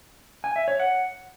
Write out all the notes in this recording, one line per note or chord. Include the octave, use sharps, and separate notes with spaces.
G#5
E5
C#5
F#5